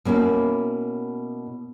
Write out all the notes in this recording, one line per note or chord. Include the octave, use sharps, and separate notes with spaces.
B2 A#3 C#4 E4